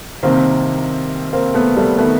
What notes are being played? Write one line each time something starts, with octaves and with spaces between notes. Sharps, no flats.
C2 C3 D#3 A#3 C4
A#3 C4
A3 B3
G3 A3
D#3 A3 B3